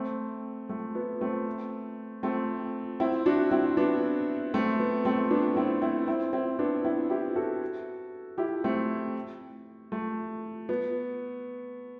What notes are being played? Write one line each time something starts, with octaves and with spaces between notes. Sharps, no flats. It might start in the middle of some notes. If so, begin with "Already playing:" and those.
Already playing: A3 C4
A3
B3
A3 C4
A3 C4
C4 E4
D4 F#4
C4 E4
B3 D4
A3 C4
B3
A3 C4
B3 D4
C4 E4
C4 E4
C4 E4
C4 E4
B3 D4
C4 E4
E4 G4
F#4 A4
E4 G4
A3 C4
A3
B3